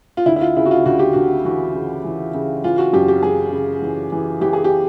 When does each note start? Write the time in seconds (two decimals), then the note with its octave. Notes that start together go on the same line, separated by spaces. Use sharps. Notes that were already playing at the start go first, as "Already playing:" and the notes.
0.17 F4
0.26 D2 E4
0.36 E4
0.41 F4
0.56 C#3 E4
0.65 F#4
0.71 F4
0.86 D2 F#4
0.99 G4
1.13 D2 F#4
1.45 E3 F#4
1.75 C#3
2.04 E3
2.35 C#3
2.64 E3 F4
2.78 F#4
2.93 F#2 G4
3.08 G4
3.23 F#2 G#4
3.52 C#3
3.82 E3
4.12 E3
4.41 E3 G4
4.53 G#4
4.64 G4